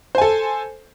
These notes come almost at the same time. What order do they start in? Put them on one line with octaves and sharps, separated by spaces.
C5 G#5 A4